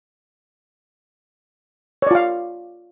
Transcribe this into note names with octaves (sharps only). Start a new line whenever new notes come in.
F4 C#5 D5 F5